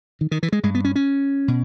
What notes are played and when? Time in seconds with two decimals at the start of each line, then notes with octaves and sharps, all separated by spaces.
0.21 D#3
0.31 D#3
0.43 E3
0.52 G#3
0.63 G2 G#3
0.75 B3
0.85 C#4
0.96 C#4
1.48 B2